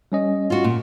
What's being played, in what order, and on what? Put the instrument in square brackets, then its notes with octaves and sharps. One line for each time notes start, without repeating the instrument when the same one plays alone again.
[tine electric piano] G3 C#4 D#5
[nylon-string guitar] F4 F#4
A#2